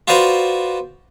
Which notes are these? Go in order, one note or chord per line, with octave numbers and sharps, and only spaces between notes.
F4 F#4 B4 C5 D5 A#5